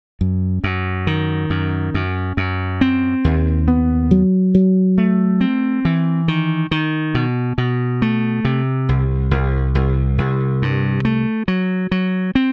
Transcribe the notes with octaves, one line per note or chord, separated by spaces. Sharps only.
F#2
F#2
D#3
F#2
F#2
F#2
C4
D#2
B3
F#3
F#3
A3
C4
E3
D#3
D#3
B2
B2
A3
C3
C2
C2
C2
C2
G2
A3
F#3
F#3
C4